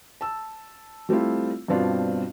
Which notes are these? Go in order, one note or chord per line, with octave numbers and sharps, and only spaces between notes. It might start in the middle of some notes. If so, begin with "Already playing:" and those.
A5 E6
G3 A3 C4 E4 F4
G2 B2 B3 C4 D4 F4